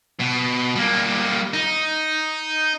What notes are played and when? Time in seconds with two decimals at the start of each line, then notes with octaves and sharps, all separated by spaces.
0.20 B2
0.75 G3 A#3
1.54 D#4